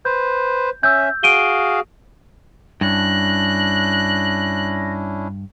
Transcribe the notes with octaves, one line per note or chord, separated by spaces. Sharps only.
B4 C5 G6
C#4 E5 E6 G6
F#4 G#4 F5 D7 D#7 G7
G2 C#4 D4 E4 F#6 A#6